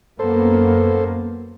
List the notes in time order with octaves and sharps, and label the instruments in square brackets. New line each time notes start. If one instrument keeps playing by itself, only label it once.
[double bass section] F#2 A#3 B3 [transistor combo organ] A4 C5